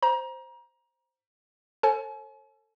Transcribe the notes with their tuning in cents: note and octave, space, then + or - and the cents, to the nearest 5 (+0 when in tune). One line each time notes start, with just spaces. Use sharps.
C5 +0 A#5 +30
A4 +30 C#5 -45 G#5 +45